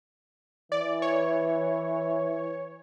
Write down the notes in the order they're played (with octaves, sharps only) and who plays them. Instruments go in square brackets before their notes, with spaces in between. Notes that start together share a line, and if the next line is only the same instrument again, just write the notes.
[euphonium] E3 [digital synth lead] D5
[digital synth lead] C#5